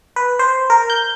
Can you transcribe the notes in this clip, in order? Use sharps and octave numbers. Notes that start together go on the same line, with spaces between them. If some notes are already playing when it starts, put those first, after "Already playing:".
B4
C5
A#4
G6